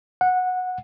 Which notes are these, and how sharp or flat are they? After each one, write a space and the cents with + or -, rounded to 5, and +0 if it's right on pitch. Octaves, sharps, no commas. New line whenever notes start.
F#5 -15